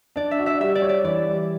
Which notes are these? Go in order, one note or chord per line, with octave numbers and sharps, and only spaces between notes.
D4 D5
E5
F#4
E5
G3 E5
D5
C#5
D5
E3 D5
G3